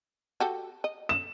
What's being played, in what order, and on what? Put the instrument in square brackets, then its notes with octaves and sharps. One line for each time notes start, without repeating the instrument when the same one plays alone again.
[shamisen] F#4 G4 A4
D#5
[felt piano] E7